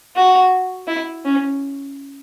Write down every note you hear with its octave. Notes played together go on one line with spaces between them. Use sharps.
F#4
E4
C#4